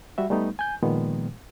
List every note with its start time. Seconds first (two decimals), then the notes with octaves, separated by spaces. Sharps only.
0.18 G3 F#4 E5
0.30 G3 A3 B3 D#4
0.59 G#5 G6
0.83 A#2 D#3 F3 G#3 B3